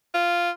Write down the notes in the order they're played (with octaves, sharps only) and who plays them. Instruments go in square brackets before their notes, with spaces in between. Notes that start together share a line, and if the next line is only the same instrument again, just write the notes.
[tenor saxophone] F4